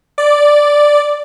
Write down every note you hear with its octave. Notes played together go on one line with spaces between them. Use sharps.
D5